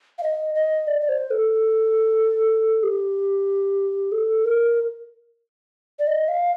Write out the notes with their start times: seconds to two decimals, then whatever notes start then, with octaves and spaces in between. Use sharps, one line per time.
0.18 F5
0.23 D#5
0.55 D#5
0.87 D5
1.01 D5
1.09 C5
1.31 A4
2.83 G4
4.12 A4
4.45 A#4
5.99 D5
6.07 D#5
6.28 F5